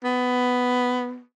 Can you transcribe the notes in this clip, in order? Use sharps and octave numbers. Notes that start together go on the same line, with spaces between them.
B3